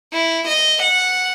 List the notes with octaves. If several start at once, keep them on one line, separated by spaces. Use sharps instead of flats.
E4
D#5
F#5